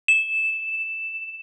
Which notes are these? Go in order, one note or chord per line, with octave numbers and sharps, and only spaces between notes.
E7